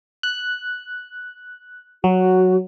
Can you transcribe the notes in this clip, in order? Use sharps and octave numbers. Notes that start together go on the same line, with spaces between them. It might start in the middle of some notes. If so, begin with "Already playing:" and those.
F#6
F#3 F#4